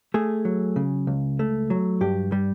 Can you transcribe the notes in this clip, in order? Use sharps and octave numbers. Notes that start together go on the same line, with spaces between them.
A3 G#4
F#3
C#3
C#2
A3
F#3
G2 G4
G3